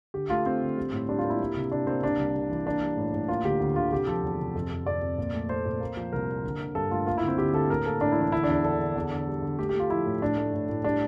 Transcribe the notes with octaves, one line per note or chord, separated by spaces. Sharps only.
D3 G4
A3 F4
A3 C4
D3
G3
A2
G3 D4
F4
A#3
E4
G3
C3
C3 D4
A#3 C4
C3 D4
C2
C3
E3
A#3 D4
G3
A2
A2
A#3 F4
D2 G4
D2
D3 F4
C3 G4
F3 A4
E2
C3
F2
F2
F2 D5
F2
A#2
A3
A3 C5
A#2
A#3
F3
C2 A#4
A#3
D3
D3
G2 A4
A3 F4
A#3 F4
E4
D2
C4
D3 G4
D3 A4
A2 A#4
A#3 A4
A2 D4
E4
E3 D4
D3 E4
D4
E2
D3 A4
D3
E2
D3
G3
D3
A3 G4
G4
A3
F4
F3 E4
A2
A2 D4
A3
A2
A2
G3 D4